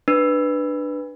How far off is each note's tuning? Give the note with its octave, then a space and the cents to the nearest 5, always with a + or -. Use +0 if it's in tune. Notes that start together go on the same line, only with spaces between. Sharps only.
D4 +15 B4 +0